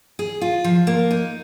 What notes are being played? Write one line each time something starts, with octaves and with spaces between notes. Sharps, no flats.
G#4
F4
F3
A#3
D#4